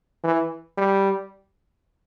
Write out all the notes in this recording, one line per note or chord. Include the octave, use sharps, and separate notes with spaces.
E3
G3